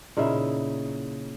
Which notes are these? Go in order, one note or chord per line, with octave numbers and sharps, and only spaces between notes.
A#2 C#3 D#4 E4